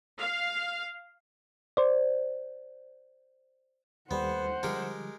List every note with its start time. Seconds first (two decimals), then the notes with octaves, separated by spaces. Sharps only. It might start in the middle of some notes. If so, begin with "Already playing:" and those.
0.18 F5
1.77 C5 D5
4.11 D#2 G3 B3 A4 C5 F#5
4.63 D3 F3 G3 G#3 G4 A#4